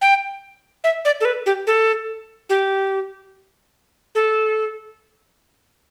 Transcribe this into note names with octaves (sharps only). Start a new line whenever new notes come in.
G5
E5
D5
A4
B4
G4
A4
G4
A4